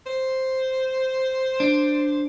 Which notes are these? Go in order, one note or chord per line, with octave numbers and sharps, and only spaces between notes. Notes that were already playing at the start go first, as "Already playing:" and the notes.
C5
D4